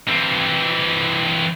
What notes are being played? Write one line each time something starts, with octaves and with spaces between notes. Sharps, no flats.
E3 C4